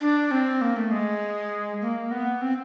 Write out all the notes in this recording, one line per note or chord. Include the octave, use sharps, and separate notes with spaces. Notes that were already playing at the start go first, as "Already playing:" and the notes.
D4
C4
A#3
A3
G#3
A#3
B3
C4